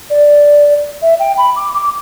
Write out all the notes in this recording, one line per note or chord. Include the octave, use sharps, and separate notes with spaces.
D5
E5
G5
B5
D6
D6